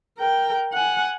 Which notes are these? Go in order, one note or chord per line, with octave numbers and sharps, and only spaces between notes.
A#4 G5
F#5 G#5